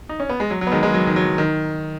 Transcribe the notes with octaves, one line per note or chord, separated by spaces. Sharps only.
D#4
C#4
B3
G#3
F#3
F#3
B3
D#3 G#3
D#3 G#3
F#3
D#3
F#3
D#3